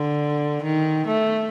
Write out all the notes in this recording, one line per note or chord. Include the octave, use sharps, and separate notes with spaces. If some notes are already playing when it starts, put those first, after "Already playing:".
Already playing: D3
D#3
A3